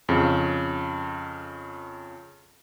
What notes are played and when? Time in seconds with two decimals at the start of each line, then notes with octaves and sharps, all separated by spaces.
0.09 F2 C#3